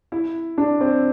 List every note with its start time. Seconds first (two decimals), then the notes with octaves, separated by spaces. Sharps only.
0.12 E4
0.58 D4
0.81 C4